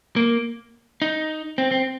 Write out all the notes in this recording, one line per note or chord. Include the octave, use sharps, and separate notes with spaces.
A#3
D#4
C4
C4